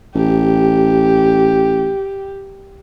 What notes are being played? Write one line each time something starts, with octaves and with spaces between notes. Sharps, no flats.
A1 G4